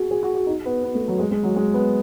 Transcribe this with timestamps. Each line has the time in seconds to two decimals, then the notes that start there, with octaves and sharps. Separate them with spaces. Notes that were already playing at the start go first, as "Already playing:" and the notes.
Already playing: F#4 G#4
0.11 G#4
0.23 F#4
0.35 F#4
0.47 D#4
0.65 B3
0.83 B3
0.95 A3
1.08 F#3
1.19 G#3
1.31 G#3
1.43 F#3
1.56 G#3
1.74 B3